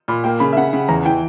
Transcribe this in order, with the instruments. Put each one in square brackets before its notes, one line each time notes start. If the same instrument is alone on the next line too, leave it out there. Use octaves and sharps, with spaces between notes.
[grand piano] A#2 [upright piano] B5
[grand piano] A#3 [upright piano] G5
[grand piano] C#3 [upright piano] B5
[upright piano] E5
[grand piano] C#3 [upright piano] F#5
[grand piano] C#3
[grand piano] E2 [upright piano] A#5
[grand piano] E3 [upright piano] G5